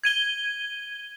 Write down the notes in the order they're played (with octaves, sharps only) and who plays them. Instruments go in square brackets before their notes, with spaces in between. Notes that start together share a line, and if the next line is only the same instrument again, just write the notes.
[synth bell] G#6 D#7 G7